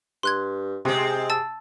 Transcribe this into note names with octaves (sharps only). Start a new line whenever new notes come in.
G2 C6 F#6 G#6
C3 G#3 C4 G#4
A5 E6 A6